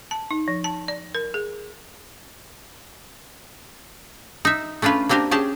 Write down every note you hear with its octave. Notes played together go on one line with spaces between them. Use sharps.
A5
D#4
F3
A5
D5
A#4
G#4
D#4 E5
A3 C#4 D4 F4 B4
A#3 C4 D4 G4 A#4
C#4 G4 G#4 A5